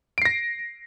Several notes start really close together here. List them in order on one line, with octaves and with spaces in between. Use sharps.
D7 C7 A#6